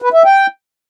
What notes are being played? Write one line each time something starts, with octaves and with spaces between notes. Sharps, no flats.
B4
E5
G5